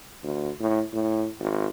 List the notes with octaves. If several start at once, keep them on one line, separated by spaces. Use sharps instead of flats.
D2
A2
A2
G#1